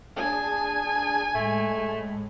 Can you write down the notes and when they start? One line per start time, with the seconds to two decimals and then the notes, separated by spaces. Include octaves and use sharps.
0.16 D4 G#4 G#5 A5
1.35 A2 G#3 A3